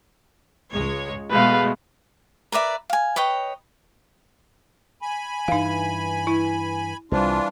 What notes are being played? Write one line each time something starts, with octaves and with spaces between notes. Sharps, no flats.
C#2 G#3 C#5
B2 G#3 A3 B4 F5
A#4 B4 D5 E5
F5 G#5
B4 C#5 D#5 G5
G#5 B5
G2 E3 D#4 F5
E4
C2 E3 G3 D4 F4 C5